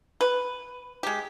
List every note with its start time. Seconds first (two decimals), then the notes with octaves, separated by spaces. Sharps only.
0.21 B4
1.03 G#3 G4